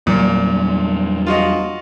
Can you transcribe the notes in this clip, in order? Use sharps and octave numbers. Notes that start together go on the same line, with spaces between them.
E2 A#2 F#3 G3
F4 F#4 D#5